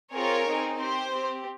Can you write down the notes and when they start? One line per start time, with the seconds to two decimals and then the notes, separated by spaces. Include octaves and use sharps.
0.13 C4 F4 G#4 A#4 C#5
0.46 C4 D#4 G#4
0.79 C4 G4 C5
1.13 C4 G4